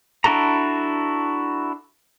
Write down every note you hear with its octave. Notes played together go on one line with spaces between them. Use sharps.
D4 E4 F#4 A4 A#5